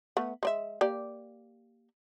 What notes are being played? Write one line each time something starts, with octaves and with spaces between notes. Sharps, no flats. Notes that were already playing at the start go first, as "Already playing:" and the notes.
A3 B3
G#3 D5 E5
A#3 G4 D5